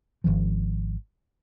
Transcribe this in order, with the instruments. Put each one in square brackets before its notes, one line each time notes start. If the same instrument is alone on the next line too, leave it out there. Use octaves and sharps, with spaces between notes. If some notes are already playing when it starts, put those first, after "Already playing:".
[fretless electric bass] G#1 D#2 D#3 F3